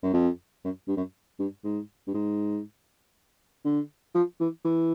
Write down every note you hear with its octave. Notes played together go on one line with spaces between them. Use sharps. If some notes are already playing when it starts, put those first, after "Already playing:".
F#2
F2
F#2
G2
F#2
G2
G#2
G2
G#2
D3
F3
E3
E3